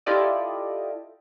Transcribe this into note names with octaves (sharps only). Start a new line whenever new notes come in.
E4 F4 G4 A4 D5 D#5